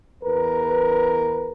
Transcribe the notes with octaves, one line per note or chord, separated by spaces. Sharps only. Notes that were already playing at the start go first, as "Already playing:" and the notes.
E2 A#4 B4